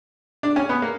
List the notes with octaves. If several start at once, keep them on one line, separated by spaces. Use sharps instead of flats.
D4
C#4
B3
A#3